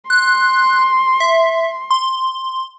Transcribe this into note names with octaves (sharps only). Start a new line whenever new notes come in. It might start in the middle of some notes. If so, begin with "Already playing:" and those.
C6 F#6
E5
C6